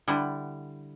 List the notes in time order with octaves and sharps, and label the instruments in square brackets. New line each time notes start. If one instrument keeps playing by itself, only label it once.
[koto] D3 G3 E4 F#5